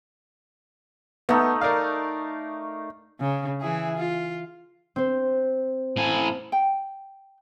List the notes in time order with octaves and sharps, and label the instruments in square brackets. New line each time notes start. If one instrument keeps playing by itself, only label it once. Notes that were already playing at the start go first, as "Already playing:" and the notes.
[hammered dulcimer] A3 D#4 [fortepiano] B3
[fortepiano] A#4 D5 F5
[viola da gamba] C#3
E3 E4 G#4
F4
[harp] C4 C5
[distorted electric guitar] A2 G#5
[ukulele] G5